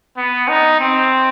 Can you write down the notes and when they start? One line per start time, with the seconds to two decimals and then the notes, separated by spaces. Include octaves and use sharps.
0.17 B3
0.48 D#4
0.81 C4